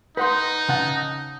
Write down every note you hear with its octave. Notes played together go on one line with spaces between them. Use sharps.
D#4 B4 F#5 C6
C#3 F#5 A5